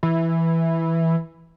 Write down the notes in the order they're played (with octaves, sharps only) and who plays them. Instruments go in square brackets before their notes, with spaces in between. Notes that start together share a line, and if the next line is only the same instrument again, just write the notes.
[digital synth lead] E3